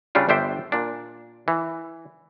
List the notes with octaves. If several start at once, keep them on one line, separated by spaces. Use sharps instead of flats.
C#3 G3 D4 F4
G1 D4 C5 E5 G5
A#2 D4
E3